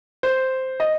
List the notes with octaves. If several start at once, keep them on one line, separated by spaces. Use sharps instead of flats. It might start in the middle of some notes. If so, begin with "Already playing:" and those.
C5
D#5